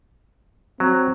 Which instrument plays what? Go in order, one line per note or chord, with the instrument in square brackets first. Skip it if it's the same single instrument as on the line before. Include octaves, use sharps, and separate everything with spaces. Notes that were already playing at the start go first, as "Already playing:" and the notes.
[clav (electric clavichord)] F#3 [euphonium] C4